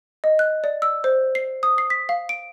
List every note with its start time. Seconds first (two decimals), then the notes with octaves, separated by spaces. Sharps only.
0.24 D#5
0.39 F#6
0.64 D5
0.82 E6
1.04 C5
1.35 C7
1.63 D#6
1.78 C7
1.90 B6
2.09 F5
2.29 D7